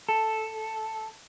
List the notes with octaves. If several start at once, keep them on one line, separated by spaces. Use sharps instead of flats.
A4